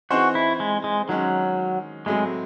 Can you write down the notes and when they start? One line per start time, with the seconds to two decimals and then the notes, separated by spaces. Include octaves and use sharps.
0.11 E3 C4 D#4 F#4 G#4 C5
0.35 E4
0.60 G#3
0.84 G#3
1.08 D#3 F#3 G#3 C#4 G#4
2.06 A2 F#3 G#3 A3 C4